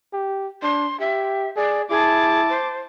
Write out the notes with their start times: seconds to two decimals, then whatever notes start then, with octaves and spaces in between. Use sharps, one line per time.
0.13 G4
0.62 D4 C6
1.00 G4 E5
1.56 G#4 D5
1.90 E4 G#4 A5 D6
2.49 C5